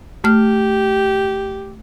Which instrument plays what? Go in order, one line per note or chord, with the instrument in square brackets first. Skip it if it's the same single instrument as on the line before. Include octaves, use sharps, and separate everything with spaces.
[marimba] A3 F6 [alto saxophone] G4